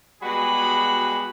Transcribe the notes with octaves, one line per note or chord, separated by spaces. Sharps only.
B2 G3 G#3 F#4 G#4 B5